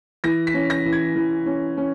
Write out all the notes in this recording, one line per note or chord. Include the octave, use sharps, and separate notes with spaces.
E3 A#6
B6
C#4
A#6
E3
G#6
E3
C#4
C#4